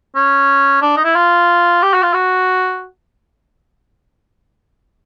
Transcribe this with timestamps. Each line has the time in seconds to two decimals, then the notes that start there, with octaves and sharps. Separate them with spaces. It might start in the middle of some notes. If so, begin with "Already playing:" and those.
0.15 C#4
0.82 D4
0.97 D#4
1.04 E4
1.16 F4
1.83 G4
1.93 F#4
2.03 F4
2.14 F#4